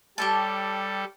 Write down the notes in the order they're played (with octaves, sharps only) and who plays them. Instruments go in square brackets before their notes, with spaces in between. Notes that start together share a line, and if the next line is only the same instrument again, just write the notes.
[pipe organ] G3 A4 [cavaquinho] G4 C#5 A5